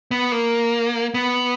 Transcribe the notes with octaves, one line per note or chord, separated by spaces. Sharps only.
B3
A#3
B3